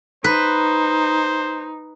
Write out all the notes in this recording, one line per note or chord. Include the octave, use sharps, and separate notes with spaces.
D#4 B4 C5